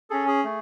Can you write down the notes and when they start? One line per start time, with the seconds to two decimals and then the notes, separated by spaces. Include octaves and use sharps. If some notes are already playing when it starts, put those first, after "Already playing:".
0.10 C#4 G#4 A4
0.27 G#4
0.44 A3